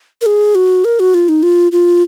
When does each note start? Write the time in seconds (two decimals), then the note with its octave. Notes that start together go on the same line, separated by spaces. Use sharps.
0.21 A#4
0.26 G#4
0.55 F#4
0.85 A#4
1.00 F#4
1.14 F4
1.29 D#4
1.43 F4
1.72 F4